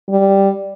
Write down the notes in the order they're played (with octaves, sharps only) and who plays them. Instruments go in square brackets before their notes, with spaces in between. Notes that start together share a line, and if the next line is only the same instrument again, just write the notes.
[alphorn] G3